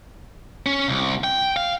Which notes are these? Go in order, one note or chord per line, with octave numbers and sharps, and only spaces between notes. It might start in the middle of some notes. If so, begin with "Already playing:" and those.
C#4
C2
G5
F5